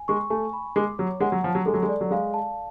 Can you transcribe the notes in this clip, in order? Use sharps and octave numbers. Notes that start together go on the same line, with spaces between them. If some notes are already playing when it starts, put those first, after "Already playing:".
Already playing: G#5
G#3 C#6
A3 G#5
B5
G#3 D6
F#3 C#5
G#3 F#5
F#3
F3 A5
F#3
G#3 A4
F#3
G#3
D5
F#3
G#3 F5
A5